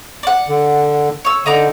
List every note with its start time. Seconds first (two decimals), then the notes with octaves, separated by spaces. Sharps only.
0.23 D5 F#5
0.49 D3
1.25 C#5 E6
1.46 D3 D#4 A#5 D6